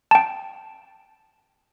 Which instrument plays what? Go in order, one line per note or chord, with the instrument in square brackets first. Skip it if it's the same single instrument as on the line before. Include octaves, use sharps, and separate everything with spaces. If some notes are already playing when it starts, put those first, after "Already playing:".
[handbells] G5 A5